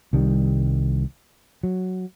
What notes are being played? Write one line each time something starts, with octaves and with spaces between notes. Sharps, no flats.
C2 D#3 G3
F#3